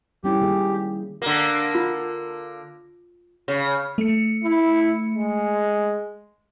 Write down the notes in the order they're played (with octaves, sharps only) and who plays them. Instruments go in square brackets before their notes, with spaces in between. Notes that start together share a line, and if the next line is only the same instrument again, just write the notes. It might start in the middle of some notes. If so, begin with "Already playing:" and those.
[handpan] G3 C#4 E4 [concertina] G4
[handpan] D#3 A#3 G#4
[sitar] D3 A#3
[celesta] F4
[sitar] C#3
[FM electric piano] A3 C#7
[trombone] E4
G#3